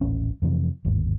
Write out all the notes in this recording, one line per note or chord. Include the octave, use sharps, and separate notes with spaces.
D#1 A1 C#4
F2 C3 E3
G1 D#2 G#2